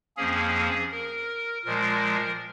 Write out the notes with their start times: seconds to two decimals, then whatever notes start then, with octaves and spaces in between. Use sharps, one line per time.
0.17 F2 F3 A#3 C#4 G#4
0.91 A#4
1.65 A#2 F3 G#3 A#4